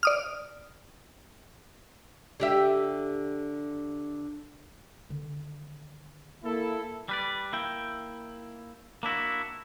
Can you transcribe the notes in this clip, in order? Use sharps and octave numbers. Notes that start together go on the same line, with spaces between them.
D5 D#6 F6
D3 G4 E5
D3 D#3
A#3 E4 A4
G3 B4 D5
A#3 E4 G5
A#3 D4 E4 F#4